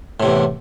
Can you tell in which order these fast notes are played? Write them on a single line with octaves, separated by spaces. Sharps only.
A2 C3 E2